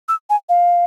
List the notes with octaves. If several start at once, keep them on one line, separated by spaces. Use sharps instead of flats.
E6
G#5
F5